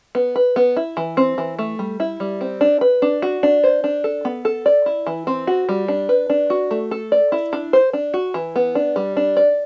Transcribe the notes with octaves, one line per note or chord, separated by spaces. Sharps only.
B3
B4
B3
E4
E3
C4
E3
A3
G3
E4
G3
C4
D4
B4
D4
F#4
D4
C5
D4
A4
B3
A4
D5
E4
E3
C4
F#4
G3
D4
B4
D4
F#4
A3
A4
D5
E4
D4
C5
D4
F#4
E3
B3
D4
G3
D4
D5